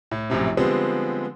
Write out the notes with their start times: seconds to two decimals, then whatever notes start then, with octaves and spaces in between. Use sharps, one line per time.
0.11 A2
0.30 A#1 F#2 A2 C3
0.57 D3 F3 G3 G#3 B3 C4